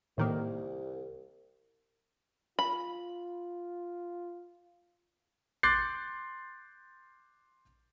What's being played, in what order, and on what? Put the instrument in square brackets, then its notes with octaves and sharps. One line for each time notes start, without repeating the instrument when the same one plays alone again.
[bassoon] C2 [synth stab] A2 D#3 A#3
[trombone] F4 [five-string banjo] B5
[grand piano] C6 D6 F#6 G6 A6 C7